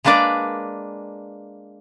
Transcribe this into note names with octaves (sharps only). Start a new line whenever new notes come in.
G#3 A#3 D4 B4 D5